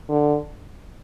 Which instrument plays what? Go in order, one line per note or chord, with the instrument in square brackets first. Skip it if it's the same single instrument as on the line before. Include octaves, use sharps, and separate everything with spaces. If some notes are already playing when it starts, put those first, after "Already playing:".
[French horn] D3